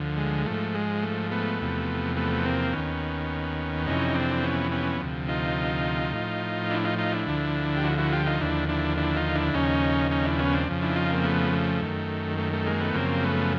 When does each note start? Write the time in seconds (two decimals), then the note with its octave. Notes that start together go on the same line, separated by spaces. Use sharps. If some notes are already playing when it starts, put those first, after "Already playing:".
Already playing: D2 D3 F3
0.17 G#3
0.46 G#2 F3 A3
0.75 G#3
1.03 A3
1.31 A3 B3
1.60 E2 C3 F3
2.16 A3 B3
2.45 A#3 C4
2.72 D#2 D#3 B3 C#4
3.86 F2 C3 E3 C#4 D#4
4.15 C4 D4
4.43 B3 C#4
4.71 B3 C#4
5.00 D2 C3 F3
5.28 D#4 F4
6.13 A2 F3
6.70 D4 E4
6.85 D#4 F4
6.98 D#4 F4
7.13 D4 E4
7.27 D2 D3 F3
7.76 G4
7.83 E4 F#4
7.98 E4 F#4
8.12 F4 G4
8.26 D#4 F4
8.41 D#2 D3 F3 D4 E4
8.69 D4 E4
8.97 D4 E4
9.16 D#4 F4
9.35 D4 E4
9.54 D#2 C#3 F3 C#4 D#4
10.11 C#4 D#4
10.25 D4 E4
10.39 B3 C#4
10.53 C4 D4
10.67 F2 C#3 F3
10.82 D4 E4
10.96 D#4 F4
11.11 A#3 C4
11.24 A3 B3
11.53 A3
11.81 F#2 D#3
12.38 A3
12.53 A3
12.66 G#3 A#3
12.81 A3 B3
12.94 F#2 C#3 F3 A#3 C4
13.23 A3 B3